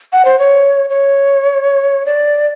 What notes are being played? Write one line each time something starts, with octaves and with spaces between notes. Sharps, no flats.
F#5
C5
C#5
C#5
D5